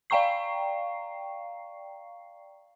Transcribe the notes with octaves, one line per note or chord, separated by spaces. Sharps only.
D5 F5 G5 A#5 C#6 C7